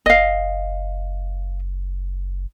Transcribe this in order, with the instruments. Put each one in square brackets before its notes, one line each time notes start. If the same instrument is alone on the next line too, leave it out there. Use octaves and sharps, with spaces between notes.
[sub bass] F#1 [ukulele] D#5 F5